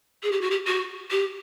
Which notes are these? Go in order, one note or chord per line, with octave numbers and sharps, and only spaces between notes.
G#4
G4
F#4
G4
F#4
G4